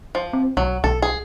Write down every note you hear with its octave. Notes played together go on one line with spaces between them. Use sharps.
F3
C4
B1 F#3
B1 A4
G#4